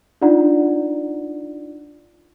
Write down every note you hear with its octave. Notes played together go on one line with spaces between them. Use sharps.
D4 D#4 F4 D5 F#5 A#5